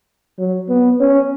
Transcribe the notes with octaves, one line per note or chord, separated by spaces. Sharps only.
F#3
B3
C#4